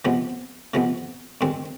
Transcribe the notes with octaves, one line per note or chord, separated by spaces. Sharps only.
C3 F3 G#3 B3
C3 F3 G#3 B3
G2 D#3 G#3 C4